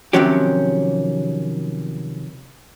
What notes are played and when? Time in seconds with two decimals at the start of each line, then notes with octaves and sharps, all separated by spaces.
0.13 C3 D#3 F3 F#3 C#4 G4